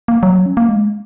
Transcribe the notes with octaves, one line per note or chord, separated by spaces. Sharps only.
A#3
F#3
C#4
A#3
G#3